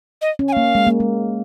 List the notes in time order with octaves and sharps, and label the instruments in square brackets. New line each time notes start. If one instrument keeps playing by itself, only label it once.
[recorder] D#5
[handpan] C#4
[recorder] G#5
[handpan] A#3 [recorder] F5
[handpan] G#3
A#3
G#3